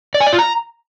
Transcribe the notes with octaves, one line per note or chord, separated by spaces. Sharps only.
D5
G#5
D5
F4
A#5